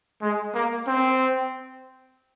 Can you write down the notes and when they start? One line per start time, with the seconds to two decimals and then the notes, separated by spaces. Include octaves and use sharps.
0.21 G#3
0.54 A#3
0.87 C4